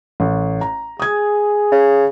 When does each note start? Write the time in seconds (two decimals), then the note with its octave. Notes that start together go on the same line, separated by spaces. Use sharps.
0.20 A1
0.61 A#5
1.00 G#4 D#6 G#6
1.72 C#3